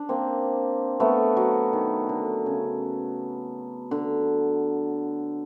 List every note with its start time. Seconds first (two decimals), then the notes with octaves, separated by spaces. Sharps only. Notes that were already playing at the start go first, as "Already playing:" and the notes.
Already playing: D4
0.09 A#3 C4
1.00 A3 B3
1.37 F#3
1.73 D#3
2.09 D3
2.46 C#3
3.91 D3